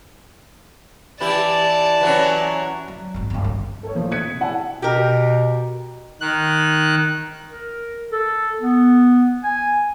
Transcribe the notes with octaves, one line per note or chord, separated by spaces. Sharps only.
E3 E4 G4 D5 A5
E3 F#3 C#4
F#3
G#1 G#3
G1 C#2
G2
A4 A#4 C#5
A#2 F3 A3
D#6 F#6 G#6 B6 C#7
C3
E4 D5 F#5 G#5 A5 E6
B2 G4 A#4
D#3 F#6
A#4
A4
B3
G#5